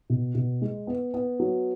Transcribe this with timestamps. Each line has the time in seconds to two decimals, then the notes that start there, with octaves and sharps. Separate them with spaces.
0.10 B2
0.35 B2
0.62 G#3
0.87 B3
1.14 B3
1.40 F#3